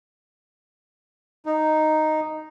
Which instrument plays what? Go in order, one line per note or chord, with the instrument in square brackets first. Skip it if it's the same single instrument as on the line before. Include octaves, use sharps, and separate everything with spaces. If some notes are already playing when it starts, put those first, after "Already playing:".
[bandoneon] D#4